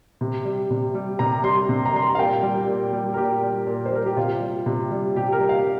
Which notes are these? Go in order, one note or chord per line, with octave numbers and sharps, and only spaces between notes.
C3
G3
C3
G3
C3 A#5
G3 C6
C3
A#5
G3 C6
A#5
F5
A#2 G5
G3
A#2
G3
A#4
A#2 G4
G3
A#2
C5
G3 A#4
G4
C3 F4
G3
C3
G3
C3 G4
A#4
G3
F5